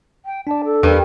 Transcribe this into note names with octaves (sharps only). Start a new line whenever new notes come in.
G5
D4 D5 A5
A4
E2 G2 A#4